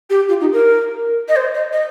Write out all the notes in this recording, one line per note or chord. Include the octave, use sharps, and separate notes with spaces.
G4
F4
D#4
A#4
D#5
C5
D#5
D#5